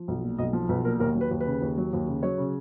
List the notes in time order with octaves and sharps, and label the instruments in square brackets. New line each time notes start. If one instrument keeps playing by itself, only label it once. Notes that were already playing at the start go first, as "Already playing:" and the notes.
Already playing: [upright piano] F3
B1
A#2
B1 D#5
F3
B1 B4
A#2 A#4
D#2 A#4
F#3
B4
D#2
B4
C#3
D#2
F#3
D#2
C#3
F#3 C#5
C#3